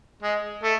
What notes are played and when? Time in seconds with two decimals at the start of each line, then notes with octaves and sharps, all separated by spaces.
0.22 G#3
0.63 A3